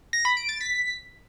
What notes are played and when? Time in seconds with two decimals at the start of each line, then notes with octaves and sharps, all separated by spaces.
0.13 A#6
0.25 B5
0.37 D7
0.49 A6
0.61 B6